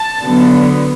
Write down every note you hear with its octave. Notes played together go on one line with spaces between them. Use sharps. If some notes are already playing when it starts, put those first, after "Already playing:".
Already playing: A5
D3 F#3 B3